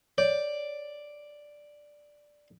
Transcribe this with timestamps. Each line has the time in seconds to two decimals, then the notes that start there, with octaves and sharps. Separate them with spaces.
0.18 C#5 D5